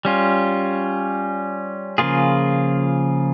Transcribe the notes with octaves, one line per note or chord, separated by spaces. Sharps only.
G3 C#4 F4
C#3 F3 A#3 F4 G#4